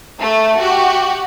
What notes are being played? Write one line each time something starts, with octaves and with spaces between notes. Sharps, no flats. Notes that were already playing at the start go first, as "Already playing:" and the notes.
A3
F#4 G4